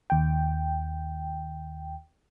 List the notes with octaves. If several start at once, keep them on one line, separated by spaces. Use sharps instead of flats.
D#2 G5